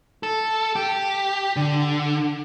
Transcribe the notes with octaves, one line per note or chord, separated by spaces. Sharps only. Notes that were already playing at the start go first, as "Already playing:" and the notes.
A4
G4
D3